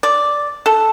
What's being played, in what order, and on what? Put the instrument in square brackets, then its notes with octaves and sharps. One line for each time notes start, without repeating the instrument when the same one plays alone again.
[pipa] D5
A4